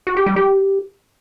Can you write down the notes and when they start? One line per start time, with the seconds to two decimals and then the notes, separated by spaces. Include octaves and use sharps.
0.07 F#4
0.17 G4
0.26 G3
0.36 G4